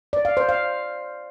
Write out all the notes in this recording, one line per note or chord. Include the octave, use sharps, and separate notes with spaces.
D5
F5
C5
F5